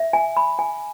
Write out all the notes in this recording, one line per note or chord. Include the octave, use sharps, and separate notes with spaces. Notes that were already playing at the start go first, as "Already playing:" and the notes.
Already playing: E5
G#5
B5
G#5